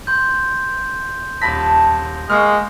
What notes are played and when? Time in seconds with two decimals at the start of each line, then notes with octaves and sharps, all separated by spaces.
0.07 C6 G6
1.42 D#1 A5 B5 A#6 B6
2.30 G#3 A#3 F5 C#6 F6